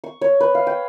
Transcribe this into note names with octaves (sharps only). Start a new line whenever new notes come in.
C#6
C#5
B4
F5
G5